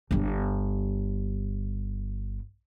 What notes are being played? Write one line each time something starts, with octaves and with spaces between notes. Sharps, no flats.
G1 G3